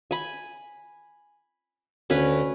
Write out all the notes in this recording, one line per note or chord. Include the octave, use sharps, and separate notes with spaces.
G#5 B5
D2 C#4 B4